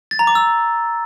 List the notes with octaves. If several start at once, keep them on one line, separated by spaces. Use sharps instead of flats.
A6
A#5
D6
E6